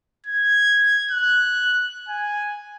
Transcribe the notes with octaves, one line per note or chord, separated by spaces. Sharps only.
G#6
F#6
G#5